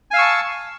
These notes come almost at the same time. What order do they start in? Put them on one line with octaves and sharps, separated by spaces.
G#5 F5 E6 C#6 A5